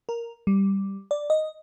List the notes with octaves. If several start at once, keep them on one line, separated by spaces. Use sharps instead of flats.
A#4
G3
D5
D#5